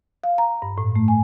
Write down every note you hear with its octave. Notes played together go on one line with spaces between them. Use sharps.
F5
A#5
G2
A2
A3
G#5